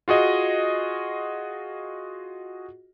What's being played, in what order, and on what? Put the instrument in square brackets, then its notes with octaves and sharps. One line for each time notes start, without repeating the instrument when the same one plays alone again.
[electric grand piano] F4 F#4 G#4 D#5